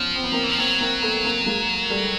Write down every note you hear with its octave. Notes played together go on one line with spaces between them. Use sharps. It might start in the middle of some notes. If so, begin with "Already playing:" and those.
Already playing: F3 B3 C#4
C4
B3
A#3 C4
E3
F3
F#3 A#3 C4
A#3 C4
A3 B3
A#3 C4
G#3 A#3
G3 A3